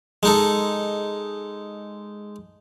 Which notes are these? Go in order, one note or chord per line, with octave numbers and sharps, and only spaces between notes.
G#3 D#4 A4